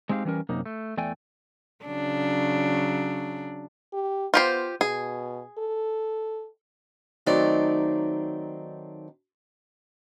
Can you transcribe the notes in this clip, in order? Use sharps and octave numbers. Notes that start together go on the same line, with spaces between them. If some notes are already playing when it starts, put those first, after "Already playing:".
G#3 C4 D#4 G4 B4 F5
E3 G3 C#4 A#4
F#2 C3 A#3 D#4
A3
E2 A3 D5 G5 G#5
C#3 F#3 D4
G4
B3 F4 G4 C5
B2 G#4
A4
D#3 F#3 A3 C4 D#4 D5